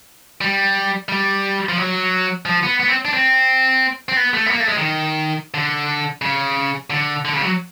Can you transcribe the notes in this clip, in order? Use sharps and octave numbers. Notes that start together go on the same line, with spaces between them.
G3
G3
F3
F#3
F3
B3
B3
C4
D4
C4
C4
B3
A3
B3
A#3
A3
G#3
D#3
D3
C#3
D3
D3
C#3
F#3